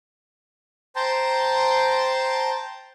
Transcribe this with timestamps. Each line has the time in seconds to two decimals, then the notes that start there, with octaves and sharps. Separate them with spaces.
0.96 C5 G5 A5 A#5 C6